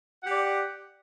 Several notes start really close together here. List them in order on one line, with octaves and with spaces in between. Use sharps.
F#5 G4 D5